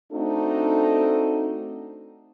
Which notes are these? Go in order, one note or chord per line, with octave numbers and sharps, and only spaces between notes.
A3 C4 D4 D#4 F#4 A4